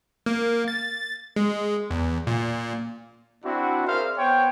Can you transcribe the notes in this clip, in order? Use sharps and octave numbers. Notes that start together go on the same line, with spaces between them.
A#3
A6
G#3
E2
A#2
C4 D4 E4 F#4
G#4 A#4 C5 D5 E5 F5
B3 C5 C#5 G5